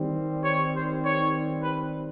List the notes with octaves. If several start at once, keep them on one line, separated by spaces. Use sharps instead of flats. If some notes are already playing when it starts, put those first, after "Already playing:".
Already playing: D#3 G3 C4
C#5
C5
C#5
B4